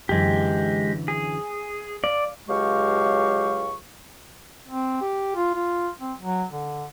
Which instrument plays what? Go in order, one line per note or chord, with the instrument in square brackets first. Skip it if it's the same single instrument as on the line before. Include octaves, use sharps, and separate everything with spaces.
[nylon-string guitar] F#2 D3 E3 [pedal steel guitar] G#3 G4
[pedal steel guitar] G#4
[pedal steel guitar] D5 [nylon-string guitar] F5
[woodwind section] C#2 F#3 G#3 G4 F5 C#6
[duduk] C4
G4
F4
F4
C4
F#3
D3